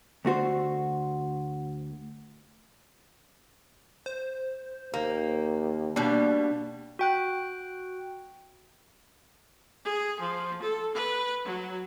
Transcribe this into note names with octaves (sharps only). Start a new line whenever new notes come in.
D2 A3 F#4 C5
C5
D#2 A#3
B2 G3 A#3 D4
F#4 G5 F#6
G#4
F3
A4
B4
F#3